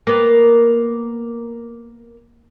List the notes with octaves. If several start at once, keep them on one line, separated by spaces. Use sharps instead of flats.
A#3 B3